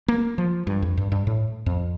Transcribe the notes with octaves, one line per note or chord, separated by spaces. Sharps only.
A#3
F3
G2
F2
G2
G2
A2
F2